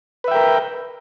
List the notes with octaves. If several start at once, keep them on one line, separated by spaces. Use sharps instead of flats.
A#4 B4 E5 G5